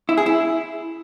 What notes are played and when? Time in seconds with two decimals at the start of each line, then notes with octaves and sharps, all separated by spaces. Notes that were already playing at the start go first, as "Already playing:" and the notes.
0.09 E4
0.18 G#4
0.26 E4